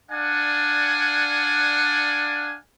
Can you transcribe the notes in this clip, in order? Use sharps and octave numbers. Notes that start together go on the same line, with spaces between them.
D4 D5 F5 F#5 G#5